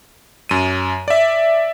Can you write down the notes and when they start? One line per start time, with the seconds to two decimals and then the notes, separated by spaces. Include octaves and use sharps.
0.49 F#2 D#7
1.08 D5 E5